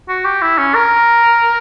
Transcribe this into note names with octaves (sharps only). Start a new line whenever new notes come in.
F#4
G4
E4
C#4
A#4